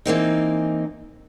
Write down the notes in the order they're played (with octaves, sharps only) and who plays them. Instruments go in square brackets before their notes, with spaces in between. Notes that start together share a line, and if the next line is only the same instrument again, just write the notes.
[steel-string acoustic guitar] E3 A#3 C4 D#4